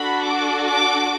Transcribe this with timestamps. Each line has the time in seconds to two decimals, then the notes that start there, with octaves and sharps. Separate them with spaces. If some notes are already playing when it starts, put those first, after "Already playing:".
Already playing: D4 F#4 A4 B5
0.24 D6
0.67 D6